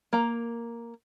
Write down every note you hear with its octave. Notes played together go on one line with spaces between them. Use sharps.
A#3 A#5